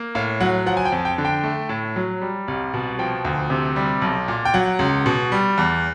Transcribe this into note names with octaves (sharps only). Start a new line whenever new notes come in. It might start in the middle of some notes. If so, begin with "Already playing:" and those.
Already playing: A#3
A2 F5
F#3 F#5
F3 F#5
G#5
G5
F2
G5
D3
G5
A3
A2
F#3
G3
C2
B2
F3 G5
D2
C3
G3
B1
A#2
G5
F#3 F#5
C#2
B2
G3
E2